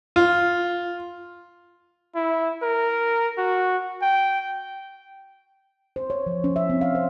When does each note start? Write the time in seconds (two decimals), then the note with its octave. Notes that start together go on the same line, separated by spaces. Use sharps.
0.16 F4
2.15 E4
2.63 A#4
3.38 F#4
4.02 G5
5.96 C5
6.10 C#5
6.26 F3
6.44 C#4
6.56 E5
6.70 C4
6.81 F5
6.95 C5